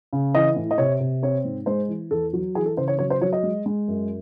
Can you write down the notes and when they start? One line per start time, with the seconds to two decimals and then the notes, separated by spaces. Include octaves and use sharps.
0.13 C#3
0.34 E3 D#5
0.56 A2
0.71 D#5
0.78 C3 C#5
1.00 C3
1.23 C4 C#5
1.45 G#2
1.66 G#3 C5
1.88 E3
2.11 E2 A4
2.33 F#3
2.55 E3 G#4
2.66 A4
2.77 C#3 C5
2.88 C#5
2.99 F#3 C#5
3.10 C5
3.21 F#3 C#5
3.33 D#5
3.43 G#3
3.66 G#3
3.88 F#2